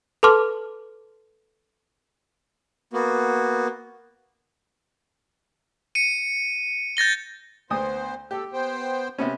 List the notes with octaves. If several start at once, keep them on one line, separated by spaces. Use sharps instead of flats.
A4 B4 A5 C6 D6 F6
A#3 B3 F#4
C#7 D#7
G6 A6 A#6 G7
D2 B3 C5 D#6
G4 A4
B3 C5 G5
C3 B3 C#4